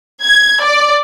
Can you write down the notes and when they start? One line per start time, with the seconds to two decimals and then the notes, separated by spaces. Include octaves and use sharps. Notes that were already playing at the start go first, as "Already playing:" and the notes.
0.22 G#6
0.61 D5